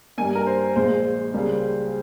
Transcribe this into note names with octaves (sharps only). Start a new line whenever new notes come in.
G2 G3 A#3 G#5
A#4
C5
A#1 A#2 G#3 C5
C#2 C#3 G3 A#3